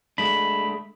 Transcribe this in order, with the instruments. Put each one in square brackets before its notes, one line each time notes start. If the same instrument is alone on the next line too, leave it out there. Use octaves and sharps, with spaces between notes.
[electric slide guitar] G#3 A3 D4 [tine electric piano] B5